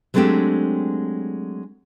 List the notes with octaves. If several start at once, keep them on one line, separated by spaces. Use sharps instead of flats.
F#3 G#3 A3 C4 D4 G4